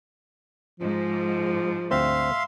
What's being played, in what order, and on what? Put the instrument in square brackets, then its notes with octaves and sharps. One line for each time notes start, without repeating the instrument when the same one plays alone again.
[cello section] G#2 [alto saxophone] F3
[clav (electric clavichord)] D2 C4 C5 [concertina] E5 F5 C6